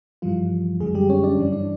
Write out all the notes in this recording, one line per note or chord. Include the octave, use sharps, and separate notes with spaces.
G2 E3 F3 G3 F4
F#2 D3 F#3 G#3 G#4
G3 G4
C#4 C#5
D4 D5
G2 E3 G3
D4 D5